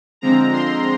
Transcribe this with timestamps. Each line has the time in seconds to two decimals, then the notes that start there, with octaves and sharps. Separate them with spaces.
0.21 D3 F3 G#3 C4 A#5
0.53 C6